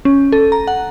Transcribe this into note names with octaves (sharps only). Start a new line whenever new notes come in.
C#4
A4
A#5
F#5